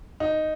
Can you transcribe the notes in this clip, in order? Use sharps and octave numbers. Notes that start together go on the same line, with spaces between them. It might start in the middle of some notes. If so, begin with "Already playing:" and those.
D#4